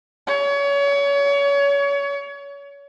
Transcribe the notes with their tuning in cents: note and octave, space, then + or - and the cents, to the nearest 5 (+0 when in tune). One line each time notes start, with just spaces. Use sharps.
C#5 +30